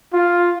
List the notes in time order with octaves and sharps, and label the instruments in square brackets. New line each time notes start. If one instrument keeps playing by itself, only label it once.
[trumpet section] F4